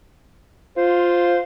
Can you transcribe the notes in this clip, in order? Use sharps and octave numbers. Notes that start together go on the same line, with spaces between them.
F4 C5